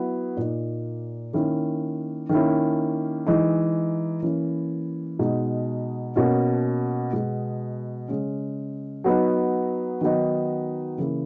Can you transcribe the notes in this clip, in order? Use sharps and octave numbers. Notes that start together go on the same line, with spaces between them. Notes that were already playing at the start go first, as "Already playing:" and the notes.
Already playing: F#3 B3 E4
A#2 A#3 D#4
D#3 A#3 C#4 E4
D#3 A#3 C#4 E4
E3 G#3 D#4
E3 A#3 C#4 E4
B2 G#3 D#4
B2 A#3 C#4
B2 G#3 B3
C#3 G#3 C#4
F#3 B3 D#4
D#3 F#3 B3 D#4
C#3 E3 A#3 E4